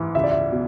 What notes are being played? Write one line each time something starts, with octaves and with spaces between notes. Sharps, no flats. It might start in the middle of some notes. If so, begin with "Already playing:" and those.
Already playing: G#2 E3
C#2 E5
D5
E5
B2